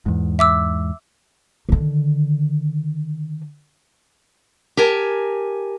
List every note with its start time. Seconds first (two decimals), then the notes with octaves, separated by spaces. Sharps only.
0.06 E2 G#2
0.39 E5 D6 E6
1.69 D3 D#3
4.77 G4 A#4 G#5 A5